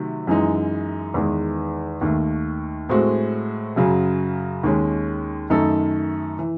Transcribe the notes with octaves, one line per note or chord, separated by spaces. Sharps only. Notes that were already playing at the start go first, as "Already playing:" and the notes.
Already playing: C3 D#3 F#3 A3
F#2 E3 G#3 D#4
E2 D#3 G#3
D#2 D#3 A3
A2 G#3 C4 F#4
F#2 C#3 F#3
D#2 D#3 G#3 C#4
F#2 D#3 A3 D#4 A4
E3